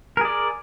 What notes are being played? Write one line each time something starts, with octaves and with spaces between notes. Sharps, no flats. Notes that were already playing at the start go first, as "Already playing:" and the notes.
G#4 A#4 D5